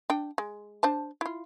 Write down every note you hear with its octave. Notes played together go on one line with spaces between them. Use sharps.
D4 G5
G#3
D4 C5 A5
E4 F4